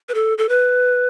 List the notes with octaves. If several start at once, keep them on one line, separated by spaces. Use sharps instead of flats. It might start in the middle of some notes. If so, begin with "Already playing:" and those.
B4
A4
A4
B4